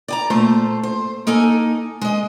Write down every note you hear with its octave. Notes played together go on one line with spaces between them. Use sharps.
D5 G#5 A#5
A#2 A3 C5 A5
C5
A#3 D#4 A4 G#5
G#3 D#5